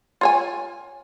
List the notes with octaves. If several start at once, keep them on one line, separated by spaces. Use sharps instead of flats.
F4 C#5 G#5